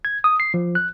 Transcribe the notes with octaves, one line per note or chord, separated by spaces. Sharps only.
G#6
D#6
C7
F3
F#6